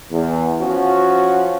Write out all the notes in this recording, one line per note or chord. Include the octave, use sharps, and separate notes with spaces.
E2
F3 C#4 F#4